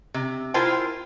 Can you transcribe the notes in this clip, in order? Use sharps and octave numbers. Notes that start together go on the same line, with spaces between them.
C3
E4 F4 A#4 C5 G5 G#5